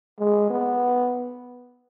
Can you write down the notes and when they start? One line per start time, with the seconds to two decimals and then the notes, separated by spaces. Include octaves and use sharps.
0.19 G#3
0.50 B3